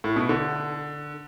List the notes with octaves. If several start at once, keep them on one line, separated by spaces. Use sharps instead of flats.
A2
B2
D3